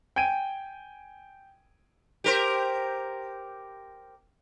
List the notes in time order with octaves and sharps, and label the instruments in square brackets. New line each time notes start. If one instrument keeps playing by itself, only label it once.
[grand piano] G5 G#5 G#6 D7 D#7
[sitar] G4 A#4 C5